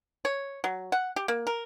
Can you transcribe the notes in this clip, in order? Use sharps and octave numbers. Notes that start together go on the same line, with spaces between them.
C#5
F#3
F#5
G4
A#3
A#4